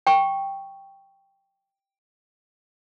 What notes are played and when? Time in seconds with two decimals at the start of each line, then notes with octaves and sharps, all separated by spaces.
0.07 G5 C#6